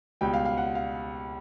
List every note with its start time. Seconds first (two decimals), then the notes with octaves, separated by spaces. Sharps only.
0.21 C#2 B2 G3 G5
0.34 F5
0.45 F5
0.58 F#5
0.75 F5